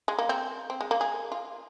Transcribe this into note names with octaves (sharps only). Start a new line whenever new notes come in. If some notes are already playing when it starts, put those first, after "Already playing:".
G#3
A#3
C4
C4
G#3
A#3
G#4
F4